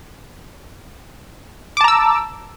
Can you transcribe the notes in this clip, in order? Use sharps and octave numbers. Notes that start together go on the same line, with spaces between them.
A5 A#5 D6 E6